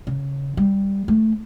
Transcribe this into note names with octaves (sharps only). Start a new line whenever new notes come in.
C#3
G3
A3